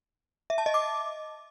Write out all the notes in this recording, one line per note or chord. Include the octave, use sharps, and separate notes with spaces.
E5
A5
D#5
D6